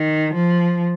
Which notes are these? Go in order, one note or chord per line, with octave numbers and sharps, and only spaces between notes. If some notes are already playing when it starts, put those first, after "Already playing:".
Already playing: D#3
F3